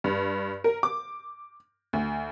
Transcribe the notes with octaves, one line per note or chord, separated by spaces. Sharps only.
G2
A#4
D6
D2